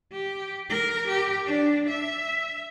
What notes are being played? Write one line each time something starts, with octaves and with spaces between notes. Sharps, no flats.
G4
A#4
G4
D4
E5